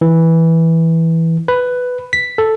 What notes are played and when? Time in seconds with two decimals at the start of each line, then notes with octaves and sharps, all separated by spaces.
0.01 E3
1.48 B4
2.13 B6
2.38 A4